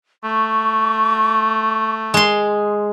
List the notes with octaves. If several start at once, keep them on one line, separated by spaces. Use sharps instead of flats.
A3 C#6
G#3 C6